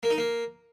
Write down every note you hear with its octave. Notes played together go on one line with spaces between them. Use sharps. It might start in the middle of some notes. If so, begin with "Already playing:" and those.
A#3
D#4
A#3